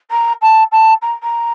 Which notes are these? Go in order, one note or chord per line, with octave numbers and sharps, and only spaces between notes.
A#5
A5
A5
A#5
A#5